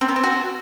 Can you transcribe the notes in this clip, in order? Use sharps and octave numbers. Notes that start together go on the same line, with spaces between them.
C4
B3
C4
F#4